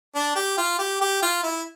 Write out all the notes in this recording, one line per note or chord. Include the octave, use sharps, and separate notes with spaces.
D4
G4
F4
G4
G4
F4
E4